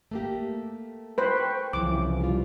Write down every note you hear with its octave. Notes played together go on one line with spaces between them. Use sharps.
A3 A#3 G4
B4 C5 G5 C#6
C2 C#3 E3 F3 D6
G3 F4